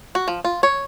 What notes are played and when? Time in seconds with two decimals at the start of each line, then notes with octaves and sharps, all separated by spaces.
0.15 F#4
0.28 F3
0.45 F4
0.63 C#5